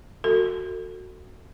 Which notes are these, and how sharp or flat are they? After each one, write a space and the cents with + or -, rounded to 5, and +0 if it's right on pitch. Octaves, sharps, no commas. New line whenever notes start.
F#4 +0 A4 +35